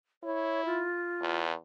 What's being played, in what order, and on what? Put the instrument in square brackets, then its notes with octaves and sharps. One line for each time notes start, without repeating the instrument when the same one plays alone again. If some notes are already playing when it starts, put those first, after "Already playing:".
[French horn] E4 [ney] C#5
[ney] F4
[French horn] E2